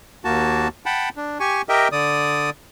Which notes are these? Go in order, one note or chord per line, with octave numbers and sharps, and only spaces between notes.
D#2 A#3 F#4 A5
F#5 G5 A5 B5
D4
G4 G#5 C#6
G4 A#4 D#5 E5 G5
D3 D5 D#6